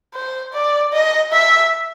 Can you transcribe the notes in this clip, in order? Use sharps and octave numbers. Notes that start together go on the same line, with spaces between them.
C5
D5
D#5
E5